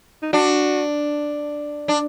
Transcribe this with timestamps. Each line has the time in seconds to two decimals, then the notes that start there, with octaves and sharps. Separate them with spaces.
0.23 D#4
0.33 D4 F#4
1.88 D4